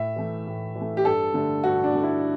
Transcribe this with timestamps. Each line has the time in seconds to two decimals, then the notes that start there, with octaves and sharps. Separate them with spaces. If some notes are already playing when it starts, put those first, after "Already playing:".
Already playing: A2 E5
0.16 E3 A3
0.47 A2
0.76 E3
0.81 A3
0.97 G4
1.05 G2 A4
1.34 D3 A3
1.64 G2 F#4
1.84 D4
1.93 D3 A3
2.03 E4